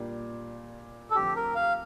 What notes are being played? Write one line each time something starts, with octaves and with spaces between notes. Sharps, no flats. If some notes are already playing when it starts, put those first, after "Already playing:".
Already playing: A#2 G3 A#3 D4 G4
A4
F2 D3 A3 G4
A#4
F5